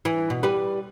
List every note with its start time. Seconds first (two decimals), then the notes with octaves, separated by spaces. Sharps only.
0.05 E3
0.30 B2
0.43 G3 B4